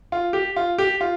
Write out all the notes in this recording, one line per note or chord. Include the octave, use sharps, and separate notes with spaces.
F4
G4
F4
G4
F4